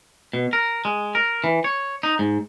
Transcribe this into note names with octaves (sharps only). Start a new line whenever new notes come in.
B2
A#4
G#3
A#4
E3
C#5
D#4
G#2